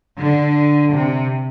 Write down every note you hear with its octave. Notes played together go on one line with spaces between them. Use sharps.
D3
C3